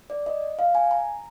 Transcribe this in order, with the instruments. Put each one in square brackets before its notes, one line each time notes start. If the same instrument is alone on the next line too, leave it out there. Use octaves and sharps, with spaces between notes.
[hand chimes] D5
D#5
F5
G#5
A#5